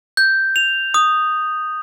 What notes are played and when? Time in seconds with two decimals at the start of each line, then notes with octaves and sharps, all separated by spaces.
0.17 G6
0.56 F7
0.94 D#6